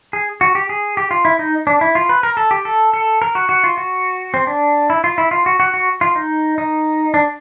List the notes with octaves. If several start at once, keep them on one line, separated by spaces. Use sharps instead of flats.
G#4
F#4
G4
G#4
G4
F4
E4
D#4
D4
E4
F4
B4
A#4
A4
G4
A4
A4
A#4
F#4
F#4
F4
F#4
C4
D4
E4
F4
E4
F4
F#4
F#4
F#4
F4
D#4
D#4
D4